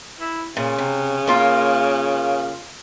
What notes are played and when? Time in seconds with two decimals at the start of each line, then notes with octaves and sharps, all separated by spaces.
0.20 E4
0.57 A#2 C#3
0.78 C3
1.27 A#3 F4 A#4